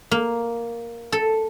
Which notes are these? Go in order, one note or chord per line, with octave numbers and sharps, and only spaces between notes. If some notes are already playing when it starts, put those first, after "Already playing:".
A#3
A4